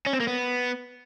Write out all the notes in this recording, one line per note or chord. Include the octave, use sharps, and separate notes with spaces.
C#4
C4
A#3
B3